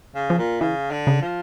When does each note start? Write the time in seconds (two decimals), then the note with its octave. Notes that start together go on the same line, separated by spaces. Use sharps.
0.15 C#3
0.30 F3
0.38 A#2
0.61 C#3 E3
0.91 D3
1.07 C#3
1.22 F3